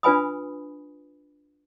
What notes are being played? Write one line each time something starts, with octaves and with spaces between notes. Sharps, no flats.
D4 F4 B4 G#5 B5 D#6